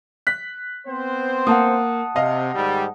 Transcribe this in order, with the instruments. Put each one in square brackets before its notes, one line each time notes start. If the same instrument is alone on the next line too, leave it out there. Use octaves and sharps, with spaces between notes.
[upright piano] F#6 B6
[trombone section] B3 C4 C5
[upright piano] A#3 [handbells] F#5 A5 D#6
[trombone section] C3 [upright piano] D#5 F5
[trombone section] G#2 D#3 G3